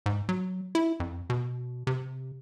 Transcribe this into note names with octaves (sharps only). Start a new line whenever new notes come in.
G#2
F#3
E4
F2
B2
C3